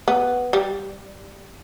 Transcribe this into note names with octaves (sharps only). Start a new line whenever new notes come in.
B3
G3